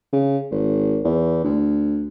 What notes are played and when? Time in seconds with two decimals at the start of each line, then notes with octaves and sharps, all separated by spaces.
0.13 C#3
0.51 G#1
1.05 E2
1.44 D2